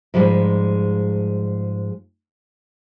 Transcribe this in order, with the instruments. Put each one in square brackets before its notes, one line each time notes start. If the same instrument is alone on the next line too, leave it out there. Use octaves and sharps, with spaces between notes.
[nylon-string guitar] G#2 F3 G3 G#3